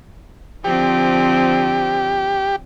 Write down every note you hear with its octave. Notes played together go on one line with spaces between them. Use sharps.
D3 F3 C4 G4